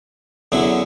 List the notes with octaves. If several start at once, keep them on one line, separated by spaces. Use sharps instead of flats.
E2 D3 F#3 C#4 E4